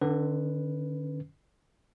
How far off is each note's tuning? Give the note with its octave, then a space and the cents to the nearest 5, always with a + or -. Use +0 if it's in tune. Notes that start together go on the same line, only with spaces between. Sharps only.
D3 +35 C#4 +0 B4 +0